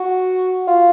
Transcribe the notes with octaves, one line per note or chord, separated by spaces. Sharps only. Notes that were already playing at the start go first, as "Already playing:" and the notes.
Already playing: F#4
F4